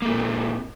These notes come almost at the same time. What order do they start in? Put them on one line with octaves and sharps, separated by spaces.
A#3 A3 A#2 C4